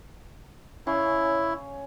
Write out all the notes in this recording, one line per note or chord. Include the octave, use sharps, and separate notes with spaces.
C#3 C#4 E4 C6